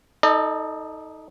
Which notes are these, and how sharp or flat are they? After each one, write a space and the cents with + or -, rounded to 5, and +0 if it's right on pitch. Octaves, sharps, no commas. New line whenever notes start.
D#4 +20 A4 +0 D#5 -45